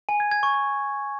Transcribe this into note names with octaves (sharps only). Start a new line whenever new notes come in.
G#5
G#6
G#6
C#6
G#6